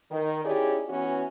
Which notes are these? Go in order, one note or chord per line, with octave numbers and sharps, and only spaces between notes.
D#3
C#4 D#4 E4 G4 G#4 D5
E3 B3 C#4 F#4